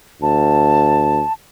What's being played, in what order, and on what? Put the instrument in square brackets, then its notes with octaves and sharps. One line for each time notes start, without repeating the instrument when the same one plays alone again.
[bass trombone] D2 [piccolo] A5